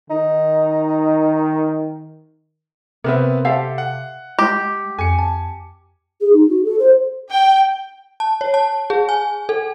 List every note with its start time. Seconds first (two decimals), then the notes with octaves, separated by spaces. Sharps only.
0.10 D#3 D#4
3.04 C3 B3 C4 A#4 B4 E5
3.45 G4 A4 C5 E5 F5
3.78 F#5
4.39 G#3 G4
4.99 F2 G#5 C#7
5.18 A5
6.20 G#4
6.33 D#4
6.49 F#4
6.64 A4
6.78 C5
7.31 G5
8.20 A5
8.41 C#5
8.54 A5
8.90 G#4
9.09 G#5
9.49 A4